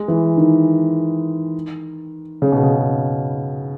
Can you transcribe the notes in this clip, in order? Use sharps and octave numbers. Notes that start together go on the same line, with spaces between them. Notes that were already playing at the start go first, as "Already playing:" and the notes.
Already playing: G#3
E3
D#3
C#3
B2
C#3